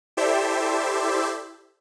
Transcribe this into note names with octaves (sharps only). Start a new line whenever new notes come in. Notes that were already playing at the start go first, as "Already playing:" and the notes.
E4 G4 A4 C5 D5 E5